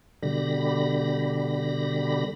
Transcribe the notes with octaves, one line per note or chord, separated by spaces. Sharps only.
B2 D3 G3 B5 A#6